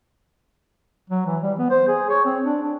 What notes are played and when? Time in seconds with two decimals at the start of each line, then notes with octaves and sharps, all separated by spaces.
1.10 F#3
1.25 E3
1.42 G3
1.58 B3
1.70 C5
1.88 G#4
2.09 C#5
2.25 C4
2.44 D4
2.63 D4